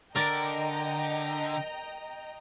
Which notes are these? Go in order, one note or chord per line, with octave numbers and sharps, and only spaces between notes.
D3 A#4 D5 D#5 G5 A#5